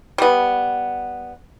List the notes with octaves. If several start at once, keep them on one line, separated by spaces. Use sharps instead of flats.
G3 B3